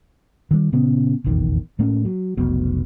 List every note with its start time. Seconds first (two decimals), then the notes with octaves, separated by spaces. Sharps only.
0.51 D#3 G3
0.72 A#2 C#3 B3 C#4
1.24 F1 A#1 E2 D#3
1.79 A2 A3 A#3 C#4
2.05 F#3
2.37 F1 B1 B2